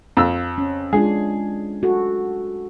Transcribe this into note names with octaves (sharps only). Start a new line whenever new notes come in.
F2 E6
C#4
G#3 D4 F4 G#4
F#4 A4